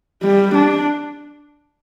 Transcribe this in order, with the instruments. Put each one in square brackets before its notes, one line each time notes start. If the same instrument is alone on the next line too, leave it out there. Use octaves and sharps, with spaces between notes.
[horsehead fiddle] G3
D4